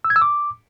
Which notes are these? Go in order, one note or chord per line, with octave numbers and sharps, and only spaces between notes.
E6
G#6
E6
D6